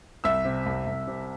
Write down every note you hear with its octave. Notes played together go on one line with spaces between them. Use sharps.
C2 E5 E6
C3
C2
C2
C3